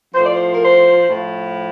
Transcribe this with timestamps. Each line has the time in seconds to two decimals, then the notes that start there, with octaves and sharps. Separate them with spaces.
0.14 A2 F3 C5
0.24 D5
0.33 C5
0.54 A#4
0.62 C5
1.09 A2 F3